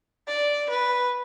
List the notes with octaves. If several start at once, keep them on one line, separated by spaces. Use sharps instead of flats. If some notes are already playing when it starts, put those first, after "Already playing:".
D5
B4